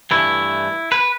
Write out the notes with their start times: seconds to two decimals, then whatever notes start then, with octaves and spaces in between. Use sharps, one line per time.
0.11 G2 E3 A3 E4
0.92 B4